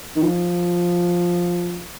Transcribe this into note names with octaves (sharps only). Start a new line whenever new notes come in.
D#3
F3